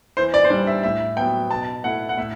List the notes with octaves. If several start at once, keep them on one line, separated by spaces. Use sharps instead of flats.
E3 C5
D5
C5
G3 D4 D5
E5
A2 E5
F#3 B3 G5
B2 A5
A3 E4 F#5
F#5
A2 E5